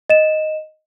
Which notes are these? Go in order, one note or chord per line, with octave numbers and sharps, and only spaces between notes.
D#5 E7